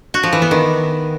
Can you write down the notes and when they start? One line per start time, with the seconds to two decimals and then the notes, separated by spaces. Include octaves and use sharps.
0.14 F#4
0.23 F3
0.33 E3
0.42 B3
0.51 D#3